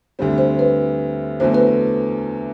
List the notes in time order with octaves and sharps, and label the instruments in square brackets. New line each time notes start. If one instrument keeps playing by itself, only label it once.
[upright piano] D2 D3 G3 C4
[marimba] C5
B4
[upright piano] E2 D3 F#3 A3 [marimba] C5
[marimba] B4